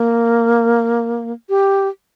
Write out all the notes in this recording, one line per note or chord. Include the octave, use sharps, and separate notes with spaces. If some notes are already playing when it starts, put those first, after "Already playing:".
Already playing: A#3
G4